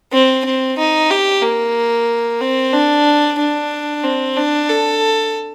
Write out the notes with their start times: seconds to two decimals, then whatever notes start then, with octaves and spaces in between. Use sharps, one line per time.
0.13 C4
0.45 C4
0.78 D#4
1.10 G4
1.42 A#3
2.41 C4
2.74 D4
3.39 D4
4.03 C4
4.37 D4
4.69 A4